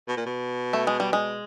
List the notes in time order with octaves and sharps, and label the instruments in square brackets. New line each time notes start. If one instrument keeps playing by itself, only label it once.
[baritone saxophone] B2
A#2
B2
[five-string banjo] A3
G#3
G3
G#3